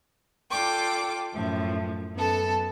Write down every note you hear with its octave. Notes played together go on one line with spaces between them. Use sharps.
F4 A4 D5 G5 D6
F#2 A2 F3
F#2 B3 A4 A5